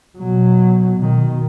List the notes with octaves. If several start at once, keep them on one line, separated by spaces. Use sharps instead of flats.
B2 F#3
B2 D#3